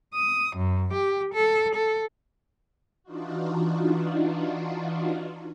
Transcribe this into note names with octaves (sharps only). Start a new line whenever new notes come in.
D#6
F#2
G4
A4
A4
E3 D4 D#4 F4 F#4